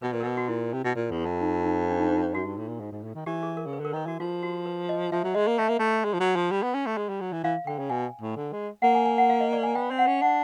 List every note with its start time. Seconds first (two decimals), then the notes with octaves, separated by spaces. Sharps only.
0.02 B2 B4
0.12 A#2 B4
0.20 A#4
0.23 B2 B4
0.37 F#4
0.48 A#2 E4
0.73 C3
0.84 B2
0.95 A#2
1.11 E2
1.26 F2
1.41 D#4
1.64 D#4
1.90 D4
2.00 D#4
2.10 D#4
2.34 F#2 F#4
2.46 G2
2.57 A2
2.68 A#2
2.80 G#2
2.92 G#2
3.03 A2
3.15 D#3
3.26 E3 G4
3.43 G#4
3.57 A#4
3.66 C#3
3.73 B4
3.80 D3 A#4
3.93 D#3 B4
4.06 E3 F#4
4.20 F3 F4
4.43 F#4
4.66 B4
4.89 D#5
5.12 F3 E5
5.24 F#3
5.35 G#3 D#5
5.47 A#3
5.58 A3 E5
5.69 A#3
5.79 A3
6.05 G#3
6.14 F3
6.20 F#3
6.36 F3
6.51 G3
6.63 B3
6.74 C#4
6.86 A3
6.98 G#3
7.09 G3
7.21 F#3
7.33 E3
7.44 E3 F5
7.67 D3 G5
7.79 C#3
7.90 B2 G#5
8.21 A2
8.36 D3
8.52 G#3
8.82 A#3 F#5
8.95 G#5
9.06 G#5
9.18 F#5
9.30 F5
9.40 D#5
9.53 D5
9.63 G#5
9.75 B3 G5
9.91 C4
9.99 F#5
10.07 C#4
10.22 D4 F#5